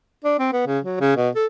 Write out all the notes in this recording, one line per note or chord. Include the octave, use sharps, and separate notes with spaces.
D4
C4
B3
C#3
F#3
C#3
B2
A4